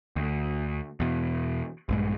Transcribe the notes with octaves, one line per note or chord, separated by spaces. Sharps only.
D2
E2 B2
A#1 G2 G#3